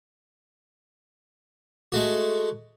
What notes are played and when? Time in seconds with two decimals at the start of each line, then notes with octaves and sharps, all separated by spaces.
1.92 G#3 A3 F#4